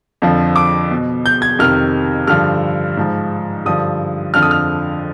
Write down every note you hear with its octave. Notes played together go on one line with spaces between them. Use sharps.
F2 D3 F3
D6
B2
G6
G#6
F2 C3 D#3 F6
G2 D3 F3 F6
G#2 F3
G2 D3 F3 D#6
F2 D3 F3 F6
D#6
F6